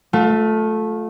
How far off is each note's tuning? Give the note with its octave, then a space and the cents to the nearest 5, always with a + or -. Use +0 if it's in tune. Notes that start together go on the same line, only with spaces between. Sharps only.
A3 -10 F4 +30